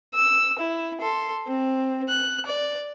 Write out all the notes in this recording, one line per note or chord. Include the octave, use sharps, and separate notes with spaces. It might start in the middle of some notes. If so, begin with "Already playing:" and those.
E6
E4
A4 C6
C4
F#6
D5